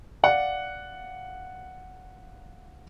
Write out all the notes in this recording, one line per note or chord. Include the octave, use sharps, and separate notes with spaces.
D5 F5 F#5